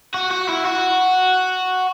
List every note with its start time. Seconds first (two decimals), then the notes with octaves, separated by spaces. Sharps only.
0.14 F#4
0.31 F#4
0.49 E4
0.65 F#4